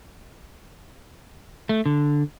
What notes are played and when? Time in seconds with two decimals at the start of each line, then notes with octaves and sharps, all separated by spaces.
1.69 A3
1.86 D3